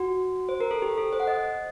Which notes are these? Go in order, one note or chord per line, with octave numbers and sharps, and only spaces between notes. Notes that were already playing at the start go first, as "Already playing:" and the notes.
Already playing: F#4
C5
A#4
A4
G4
A4
C5
F#5
D#5